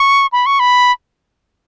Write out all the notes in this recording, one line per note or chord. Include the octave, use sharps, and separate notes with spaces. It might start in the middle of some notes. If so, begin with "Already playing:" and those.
Already playing: C#6
B5
C#6
B5